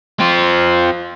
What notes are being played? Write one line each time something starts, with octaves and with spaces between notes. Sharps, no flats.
C4 F4